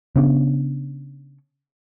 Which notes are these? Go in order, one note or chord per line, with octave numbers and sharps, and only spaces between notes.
C#3 B3 C#4 D4